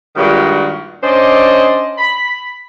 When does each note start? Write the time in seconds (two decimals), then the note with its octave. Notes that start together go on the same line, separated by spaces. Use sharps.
0.16 G2 A#2 D#3 G#3 F#4
1.03 C#4 D4 C5 D5 D#5
1.97 B5